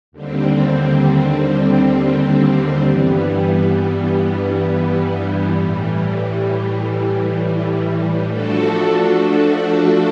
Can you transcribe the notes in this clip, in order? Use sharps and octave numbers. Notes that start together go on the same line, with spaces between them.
D#2 D3 G3 C4
G2 E3 G3 B3
A2 E3 G3
F3 A3 D4 F#4 A4